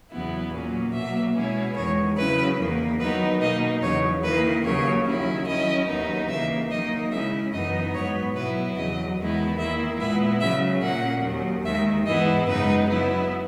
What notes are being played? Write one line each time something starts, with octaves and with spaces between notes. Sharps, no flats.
E2 C#3 F#3 B3 E4
A#2 F#3 A#3 C#4
B2 F#3 A#3 E5
B2 G#3 C#4 E4
E2 D#3 G#3 C#5
C#3 F#3 C#4 E4 B4
E2 D#3 A#3
D#3 F#3 B3 D#4 B4
B2 A#3 D#4 D#5
E2 C#3 F#3 C#5
D#3 A#3 E4 B4
D#2 C#3 F#3 A#3 C#5
D#3 F#3 C#4 E4
D#3 F#3 C#4 E4 D#5
D#2 D#3 F#3 B3 D#4
C#3 E3 A#3 E5
D#3 F#3 A#3 D#4 D#5
C#3 G#3 C#4 E4 E5
F#2 E3 B3 D#4 D#5
G#2 F#3 B3 C#5
B2 F#3 B3 E4 B4
E2 C#3 F#3 D#5
E2 D#3 G#3 B3 E4
D#3 A#3 E4 E5
A#2 G#3 B3 E4 E5
C#3 F#3 C#4 E5
A#2 A#3 C#4 F#5
D#2 D#3 F#3
D#2 D#3 G#3 E5
G#2 E3 G#3 B3 E4 D#5
F#2 C#3 G#3 B3 D#4 B4
C#3 F#3 B3 E4